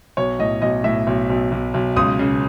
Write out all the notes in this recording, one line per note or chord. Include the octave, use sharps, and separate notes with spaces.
B1 C#5
A2 D#5
B1 D#5
A2 E5
B1
B1
B1
B1
C#2 D#6
C#3